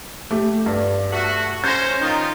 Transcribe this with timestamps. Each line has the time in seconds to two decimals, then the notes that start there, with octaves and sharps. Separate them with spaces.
0.31 A3 G4
0.66 G2
1.11 A3 F#4
1.64 C#4 C5 G6 A#6
2.01 D#3 D#4 F4